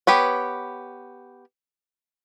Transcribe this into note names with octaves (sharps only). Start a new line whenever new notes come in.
B3 G4 B4 C#5